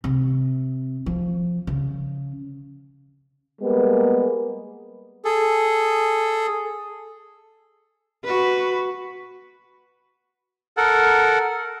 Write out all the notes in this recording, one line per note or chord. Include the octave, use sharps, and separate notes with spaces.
C3
F3
C#3
G3 G#3 A#3 B3 G#4
G#4 A4
F#4 B4
A4 A#4 F#5